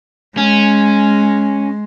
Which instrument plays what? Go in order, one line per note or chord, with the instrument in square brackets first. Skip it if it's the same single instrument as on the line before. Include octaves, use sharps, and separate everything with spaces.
[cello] G#3 [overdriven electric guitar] C#4